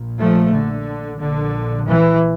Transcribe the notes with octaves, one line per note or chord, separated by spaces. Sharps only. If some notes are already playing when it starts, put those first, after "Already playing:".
Already playing: A#1 A#2
F3 A3
D3
A#1 A#2 D3
E3